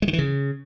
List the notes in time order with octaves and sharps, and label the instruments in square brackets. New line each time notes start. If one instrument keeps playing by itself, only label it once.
[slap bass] G#3
D#3
E3
C#3